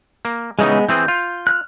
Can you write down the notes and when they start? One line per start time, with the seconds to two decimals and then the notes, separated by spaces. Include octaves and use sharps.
0.25 A#3
0.59 C#3 E3 G#3 B3 D#4
0.89 E3 C4 G#4 G6
1.08 F4
1.47 F6 F#6